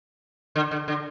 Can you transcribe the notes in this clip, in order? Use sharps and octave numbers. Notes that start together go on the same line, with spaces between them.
D3
D3
D3